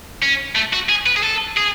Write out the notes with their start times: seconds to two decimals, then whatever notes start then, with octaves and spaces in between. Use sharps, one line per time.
0.22 C#4
0.56 A3
0.73 F#4
0.89 G#4
1.06 B4
1.16 G#4
1.23 A4
1.57 G#4